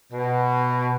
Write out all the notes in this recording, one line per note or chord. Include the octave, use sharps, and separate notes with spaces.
B2